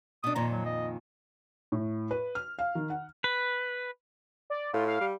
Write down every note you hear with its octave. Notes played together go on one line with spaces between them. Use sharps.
B2 D4 D#6
F2 A#2 D#3 A#5
F#3
D#5
A2
B4
F6
F5
D#3
F#5
B4
D5
A2 F4
F5
G3